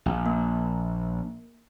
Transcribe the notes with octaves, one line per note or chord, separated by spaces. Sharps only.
A#1
A#3